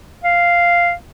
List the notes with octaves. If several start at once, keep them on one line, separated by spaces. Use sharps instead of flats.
F5